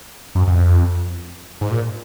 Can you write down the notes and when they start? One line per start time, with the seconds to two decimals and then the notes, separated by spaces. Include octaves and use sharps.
0.35 F#2
0.47 F#2
0.51 F2
1.61 G#2
1.71 A#2